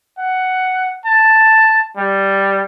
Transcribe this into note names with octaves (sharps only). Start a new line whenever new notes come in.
F#5
A5
G3